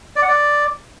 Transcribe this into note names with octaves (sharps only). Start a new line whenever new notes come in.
D5
F#5
D5